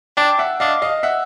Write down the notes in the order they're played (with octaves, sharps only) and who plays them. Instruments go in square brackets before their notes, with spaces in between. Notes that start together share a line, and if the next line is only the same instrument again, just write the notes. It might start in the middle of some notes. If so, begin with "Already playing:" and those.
[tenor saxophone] D4 [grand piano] G5 A5
[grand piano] E5 F#5
[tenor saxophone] D4 [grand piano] D#5 F5
[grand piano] D#5 F5
E5 F#5